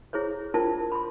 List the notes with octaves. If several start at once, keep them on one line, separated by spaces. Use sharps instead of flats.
E4 G#4 C5 C#5
D4 E4 F4 A#4 C5 A5
B5 C6